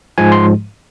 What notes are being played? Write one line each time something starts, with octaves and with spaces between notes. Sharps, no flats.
G#2 F3 G#3 G#5
C6